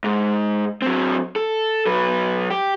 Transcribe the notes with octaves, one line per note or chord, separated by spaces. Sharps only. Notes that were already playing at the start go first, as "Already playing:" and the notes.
G#2
F#3 C4
A4
F#3 B4
G4